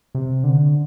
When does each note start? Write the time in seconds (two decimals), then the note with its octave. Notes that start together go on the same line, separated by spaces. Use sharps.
0.15 C3
0.44 D3